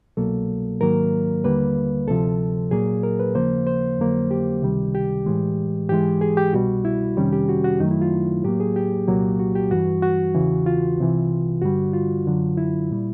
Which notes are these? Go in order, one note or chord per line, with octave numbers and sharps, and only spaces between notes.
C2 B2 F#3 A#3 A4
G#2 D#3 F#3 A#3 A#4
D#2 D3 G3 A#3 B4
D2 C3 F3 A4
A#2 F#3 A#3 G#4
A#4
B4
D#2 C#3 F3 A#3 C5
C5
F2 D3 F#3 A#3
G4
C#2 C3 D#3 G3
G4
A2 E3 G#3
G#2 E3 G#3 G4
G#4
G4
C2 B2 G3 F#4
E4
F2 C3 D#3 G3 C#4
G4
F#4
F#4
F#2 D#3 F#3 A3 D#4
E4
F4
A2 F#3 A#3 G4
G#4
G4
C2 A#2 F#3 A#3
F#4
G4
G2 E3 G3 F#4
F#4
E2 C#3 E3
F4
C2 C3 E3
G2 D3 G3 F#4
F4
F#2 D3 F#3
E4
A#2 G3